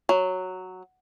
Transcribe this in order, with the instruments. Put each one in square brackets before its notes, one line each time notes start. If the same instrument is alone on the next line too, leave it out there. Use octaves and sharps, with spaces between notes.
[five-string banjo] F#3